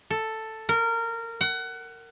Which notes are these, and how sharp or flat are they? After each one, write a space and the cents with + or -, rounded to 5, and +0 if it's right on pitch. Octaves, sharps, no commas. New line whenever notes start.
A4 +5
A#4 -20
F#5 +25